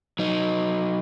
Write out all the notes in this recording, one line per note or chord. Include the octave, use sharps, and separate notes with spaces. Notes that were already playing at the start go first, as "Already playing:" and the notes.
F#3 D#4